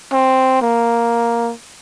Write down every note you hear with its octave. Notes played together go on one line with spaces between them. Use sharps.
C4
A#3